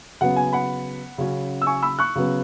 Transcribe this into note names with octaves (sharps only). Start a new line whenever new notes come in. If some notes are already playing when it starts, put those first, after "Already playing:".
C#3 F#3 B3 F#5
G#5
F#5 B5
C#3 F#3 C#4
E6
G#5 C#6
B5 E6
C#6 F#6
C#3 F#3 B3